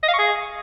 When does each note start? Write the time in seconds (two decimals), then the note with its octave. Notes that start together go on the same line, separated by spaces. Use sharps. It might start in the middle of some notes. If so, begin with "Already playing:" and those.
0.03 D#5
0.08 F5
0.13 C#6
0.18 G#4